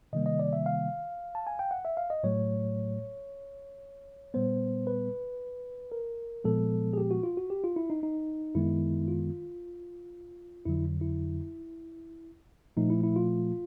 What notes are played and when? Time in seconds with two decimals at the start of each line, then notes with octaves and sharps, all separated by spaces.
0.13 C3 D#3 G3 A#3 D#5
0.26 D#5
0.39 D5
0.53 E5
0.66 F5
1.35 A5
1.47 G#5
1.59 G5
1.71 F#5
1.85 E5
1.97 F5
2.10 D#5
2.23 A2 F#3 A3 C#5
4.34 A#2 G3 B3 C5
4.87 B4
5.92 A#4
6.44 A#2 F3 G#3 B3 A4
6.93 G#4
6.98 G4
7.11 F#4
7.23 F4
7.37 F#4
7.50 G4
7.64 F4
7.76 E4
7.90 D#4
8.03 D#4
8.55 F#2 D#3 G#3 B3 E4
9.08 F4
10.66 F2 D3 F#3 E4
11.01 E4
12.77 A#2 F3 A3 D#4
12.90 E4
13.03 E4
13.16 F4